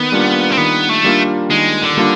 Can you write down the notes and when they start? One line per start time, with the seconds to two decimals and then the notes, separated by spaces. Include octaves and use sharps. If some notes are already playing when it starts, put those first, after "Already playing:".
Already playing: D#3 B3
0.12 G3 A#3 D4 F4
0.52 C4
0.58 D#3 B3
0.90 A3
1.04 G3 A#3 D4 F4
1.51 D#3 G#3
1.82 D3
1.97 G3 A#3 D4 F4